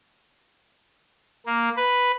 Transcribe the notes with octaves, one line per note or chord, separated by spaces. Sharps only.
A#3
B4